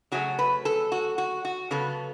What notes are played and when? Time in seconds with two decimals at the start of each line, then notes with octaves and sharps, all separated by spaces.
0.12 C#3 F#3 A3 C#4 F#4
0.39 B4
0.65 A4
0.92 F#4
1.18 F#4
1.45 F#4
1.71 C#3 F#3 B3 A4